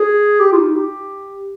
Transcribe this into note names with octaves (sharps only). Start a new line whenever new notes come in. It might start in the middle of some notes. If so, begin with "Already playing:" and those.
Already playing: G#4
G4
F4
D#4
G4